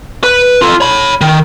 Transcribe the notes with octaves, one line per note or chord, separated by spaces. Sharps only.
B4
F4 A4
C#5 B5
D#3